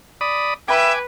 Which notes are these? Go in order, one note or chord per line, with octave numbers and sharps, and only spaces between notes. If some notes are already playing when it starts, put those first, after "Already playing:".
D5 B5 D#6
B4 E5 G5 G#5 B5 D6